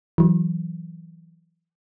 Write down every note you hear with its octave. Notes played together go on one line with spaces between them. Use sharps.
E3 F#3